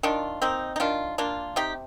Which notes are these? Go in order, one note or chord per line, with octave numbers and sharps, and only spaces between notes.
D#3 D4 F4
A#3 C4 D#4
D#4
D#3 D4 F4
A#3 D4 F4
C3 D#4 G4